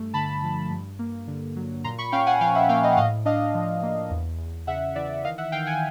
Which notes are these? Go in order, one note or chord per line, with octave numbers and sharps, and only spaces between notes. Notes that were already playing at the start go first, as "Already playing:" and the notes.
Already playing: G2 A3
D3 A5 B5
F3
G2
A#3
D3
F#3
A#2 A#5 C6
B5 C#6
C#4 F5 G5
F#5 G#5
F3 F5 G5
E5 F#5
A#3 F5 G5
D#5 F5
F#5
A2 D#5 F5
D4 D#5 F5
F3
A#3
E2
E2
C#3 E5 F#5
E3 D5 E5
D#3 D#5 F5
E5 F#5
D#3 F5 G5
F#5 G#5